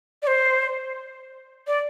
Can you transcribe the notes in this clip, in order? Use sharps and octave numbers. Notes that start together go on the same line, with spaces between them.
D5
C5
D5